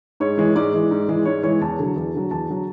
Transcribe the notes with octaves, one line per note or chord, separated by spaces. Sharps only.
G#2 C#5
E3 G#3
G#2 D5
E3 G#3
G#2
E3 G#3
G#2 C#5
E3 G#3 C#5
E2 A5
D3 F#3
E2
D3 F#3
E2 A5
D3 F#3